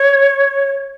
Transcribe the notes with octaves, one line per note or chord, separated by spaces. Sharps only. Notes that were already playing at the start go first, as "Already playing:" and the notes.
Already playing: C#5